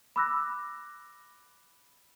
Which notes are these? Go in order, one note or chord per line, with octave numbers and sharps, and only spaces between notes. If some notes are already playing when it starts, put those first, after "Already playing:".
B5 D6 E6 F#6 A#6